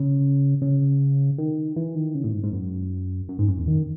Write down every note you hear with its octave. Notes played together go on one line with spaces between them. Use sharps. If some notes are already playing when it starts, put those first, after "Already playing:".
Already playing: C#3
C#3
D#3
E3
D#3
C#3
A2
G#2
G#2
F#2
F#2
G#2
F#2
E2
D#3